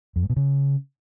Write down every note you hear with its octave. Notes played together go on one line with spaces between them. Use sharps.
F2
G2
B2
C#3